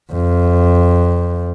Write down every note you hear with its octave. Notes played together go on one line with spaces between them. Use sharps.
F2